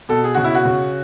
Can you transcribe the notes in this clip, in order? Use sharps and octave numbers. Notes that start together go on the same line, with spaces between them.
B2 A4
G#4
C#3 F#4
E4
F#4
C#3